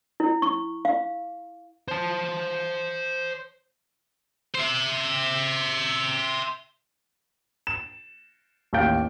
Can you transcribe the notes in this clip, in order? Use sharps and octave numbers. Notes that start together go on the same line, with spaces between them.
E4
C#6
F5
C5 A5
C5 E5
E7
A1 D#2 G4 F5 G6 D7